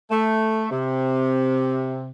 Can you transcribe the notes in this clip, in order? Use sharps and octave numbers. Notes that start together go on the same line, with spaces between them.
A3
C3